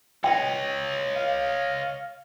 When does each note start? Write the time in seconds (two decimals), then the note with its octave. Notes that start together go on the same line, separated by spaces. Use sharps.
0.24 C#5 D#5 G5
1.16 F5